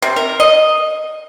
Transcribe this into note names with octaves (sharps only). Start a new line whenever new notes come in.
C3
A#4
D#5